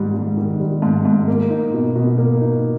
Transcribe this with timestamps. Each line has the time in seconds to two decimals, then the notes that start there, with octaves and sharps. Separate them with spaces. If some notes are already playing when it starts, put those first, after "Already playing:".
Already playing: G#2 D#3 G3
0.15 G#2
0.37 D#3
0.60 G3
0.82 G#2
1.05 G#2
1.28 A#3
1.50 D#4
1.73 B2
1.96 B2
2.18 A#3
2.41 D#4